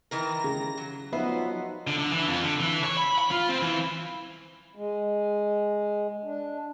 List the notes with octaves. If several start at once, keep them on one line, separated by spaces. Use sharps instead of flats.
D#3 E3 A#4 A#6
C#3
F#3
F3 F#3 B3 D#4 B4 C5 E5
D3
D3
E3
F2
D3
E3
C#5
B5
B5
F4
C4
E3
G#3
D4